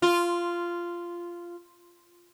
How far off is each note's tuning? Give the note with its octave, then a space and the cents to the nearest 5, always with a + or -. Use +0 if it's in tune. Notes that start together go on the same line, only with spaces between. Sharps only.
F4 -10